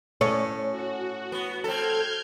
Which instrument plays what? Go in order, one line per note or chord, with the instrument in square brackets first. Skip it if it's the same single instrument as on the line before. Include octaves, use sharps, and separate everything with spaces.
[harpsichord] A2 [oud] C#4
[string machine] F#4
[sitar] B3
[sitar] C4 A4 [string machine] F6 G6 G#6